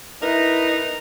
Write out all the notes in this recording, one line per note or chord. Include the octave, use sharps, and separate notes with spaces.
D#4 E4 A#4 B4